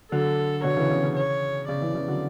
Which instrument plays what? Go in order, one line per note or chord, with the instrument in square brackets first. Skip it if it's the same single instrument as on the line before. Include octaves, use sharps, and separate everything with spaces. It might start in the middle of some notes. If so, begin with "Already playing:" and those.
[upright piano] D3 F#3 [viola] A4
[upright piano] B2 D3 [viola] C#5
[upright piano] C#3 E3
C#3
C#3
[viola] C#5
[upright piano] C#3 [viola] D5
[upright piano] C#3 E3
C#3 E3
D3 F#3